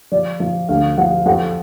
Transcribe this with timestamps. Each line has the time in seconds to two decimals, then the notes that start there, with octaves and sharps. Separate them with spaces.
0.12 F3 D5
0.40 F3
0.69 D2 F5
0.97 F3 F#5
1.26 F2 F#5